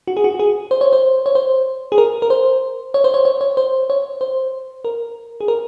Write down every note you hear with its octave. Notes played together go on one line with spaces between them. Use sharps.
F#4
G#4
F#4
G#4
C5
C#5
C5
C#5
C5
G#4
A#4
A#4
C5
C#5
C5
C#5
C#5
C#5
C5
C#5
C5
A#4
G#4
A#4